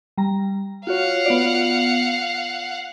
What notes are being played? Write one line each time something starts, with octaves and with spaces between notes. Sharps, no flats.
G3 A#5
F4 F#4 C#5 F5 F#5
B3 F4 D5